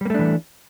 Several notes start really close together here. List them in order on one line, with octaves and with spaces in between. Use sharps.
G3 A#3 A3 D4 E3